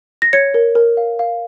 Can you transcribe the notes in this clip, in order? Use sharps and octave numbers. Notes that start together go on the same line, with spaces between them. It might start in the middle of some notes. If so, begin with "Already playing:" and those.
A#6
C#5 G#6 C#7
A#4
A#4
F5
F5